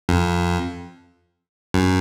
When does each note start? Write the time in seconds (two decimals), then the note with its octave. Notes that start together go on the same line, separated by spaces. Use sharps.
0.09 F2
1.74 F#2